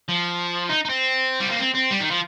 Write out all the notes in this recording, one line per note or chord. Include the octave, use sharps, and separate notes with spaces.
F3
D#4
D#4
C4
G3
A#3
C4
C4
G3
D#3
F3